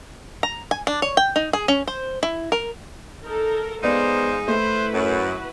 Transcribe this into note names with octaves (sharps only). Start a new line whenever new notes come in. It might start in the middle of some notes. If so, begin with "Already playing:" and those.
A#5
G#5
D4
C#5
G5
D#4
G#4
C#4
C5
E4
A#4
D#4 A4 A#4
G#3 B3 D#4 C5 D5 F5
A3 E4 B4 C5
F#2 F#4